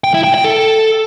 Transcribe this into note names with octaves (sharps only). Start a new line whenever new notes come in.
G5
E4
G5
G5
A4